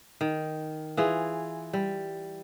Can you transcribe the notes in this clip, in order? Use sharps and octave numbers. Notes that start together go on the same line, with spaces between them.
D#3
E3 F4 G#4
G3